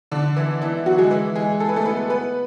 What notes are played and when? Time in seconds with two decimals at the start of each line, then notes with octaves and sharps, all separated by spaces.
0.12 D3 D4
0.36 E3 E4
0.62 E3 E4
0.86 F#3 F#4
0.98 G#3 G#4
1.11 E3 E4
1.35 G#3 G#4
1.60 A4
1.69 B4
1.76 A3 A4
1.85 B3 B4
2.10 B3 B4